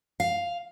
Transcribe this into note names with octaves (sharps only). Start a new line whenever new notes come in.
F5